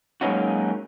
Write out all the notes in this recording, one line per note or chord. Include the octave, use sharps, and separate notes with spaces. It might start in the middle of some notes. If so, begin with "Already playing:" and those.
F#3 G#3 A#3 C#4 D#4 F#4